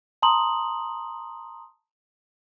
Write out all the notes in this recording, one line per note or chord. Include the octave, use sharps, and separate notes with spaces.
A5 A#5 C6 D#6 F#7